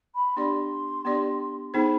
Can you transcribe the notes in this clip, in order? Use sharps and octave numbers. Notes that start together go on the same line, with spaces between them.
B5
B3 D4 G4 D5 C6
B3 D4 G4 D5
B3 D#4 G#4 C5 B5